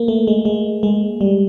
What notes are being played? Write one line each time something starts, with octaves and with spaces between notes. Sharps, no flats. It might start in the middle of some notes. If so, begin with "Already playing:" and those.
Already playing: A#3
A3
G#3
G#3
G#3
G3